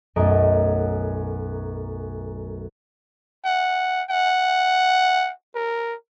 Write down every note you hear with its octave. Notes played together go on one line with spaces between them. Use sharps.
B1 F#2 A3 A#4 D#5
F#5
F#5
A#4